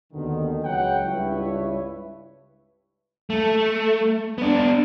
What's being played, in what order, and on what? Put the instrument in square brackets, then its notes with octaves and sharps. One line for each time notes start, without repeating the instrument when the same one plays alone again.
[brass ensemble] D#2 B2 D3 D#3
C#2 F#3 G#3 B4 F#5 G5
C#2 G2 E4 B4 C#5 E5
[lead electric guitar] A3
B3 D4